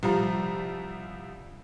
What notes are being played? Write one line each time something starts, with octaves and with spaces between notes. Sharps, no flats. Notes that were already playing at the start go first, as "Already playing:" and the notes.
C2 F3 G3 F4 A#5